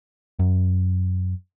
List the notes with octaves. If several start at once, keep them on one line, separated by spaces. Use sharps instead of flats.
F#2